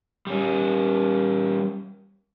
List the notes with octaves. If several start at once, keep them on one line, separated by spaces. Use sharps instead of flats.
G3 C#4